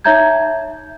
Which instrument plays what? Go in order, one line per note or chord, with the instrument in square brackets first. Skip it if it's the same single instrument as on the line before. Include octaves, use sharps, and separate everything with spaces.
[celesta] D#4 C#5 E5 A#5 G6 G#6